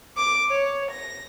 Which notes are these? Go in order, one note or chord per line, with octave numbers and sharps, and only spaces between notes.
D6
C#5
A#6